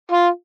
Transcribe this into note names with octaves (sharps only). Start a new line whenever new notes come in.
F4